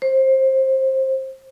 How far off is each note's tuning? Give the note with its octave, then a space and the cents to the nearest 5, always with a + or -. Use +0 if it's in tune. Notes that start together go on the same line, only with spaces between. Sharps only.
C5 +20